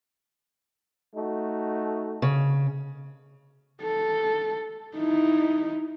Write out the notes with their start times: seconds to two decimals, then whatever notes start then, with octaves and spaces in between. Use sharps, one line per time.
1.15 A3 D#4 F#4
2.22 C#3
3.82 A4
4.97 D#4 E4